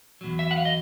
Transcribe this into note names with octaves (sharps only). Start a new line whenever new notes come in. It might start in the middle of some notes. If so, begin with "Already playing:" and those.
E2 B2 F#3
E5
F#5
F5
D#5